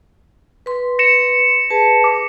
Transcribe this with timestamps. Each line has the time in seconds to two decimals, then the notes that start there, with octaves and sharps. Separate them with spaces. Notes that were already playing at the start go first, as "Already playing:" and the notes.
0.66 B4 C6
0.99 A#6 C#7 E7
1.70 G#4 B4 A5
2.04 D6